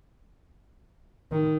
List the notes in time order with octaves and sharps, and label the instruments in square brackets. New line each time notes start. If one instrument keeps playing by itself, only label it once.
[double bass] D#3